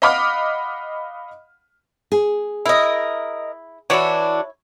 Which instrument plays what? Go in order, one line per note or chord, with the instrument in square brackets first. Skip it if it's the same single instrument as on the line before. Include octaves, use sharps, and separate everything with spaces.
[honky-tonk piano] D#5 F5 F#5 B5 D6 F6
[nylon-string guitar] G#4
[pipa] E4 [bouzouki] A#4 D#5
[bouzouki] E3 D4 F#4 [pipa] E4 C#5